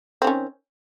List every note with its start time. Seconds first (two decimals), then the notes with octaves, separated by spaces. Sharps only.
0.22 C4
0.24 D#3
0.27 C#4